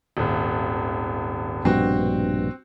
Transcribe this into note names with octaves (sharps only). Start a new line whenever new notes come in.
D#1 G#1
A#1 G2 B2 C4 F#4